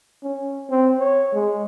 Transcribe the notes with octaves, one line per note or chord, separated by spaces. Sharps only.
C#4
C4
C#5
G#3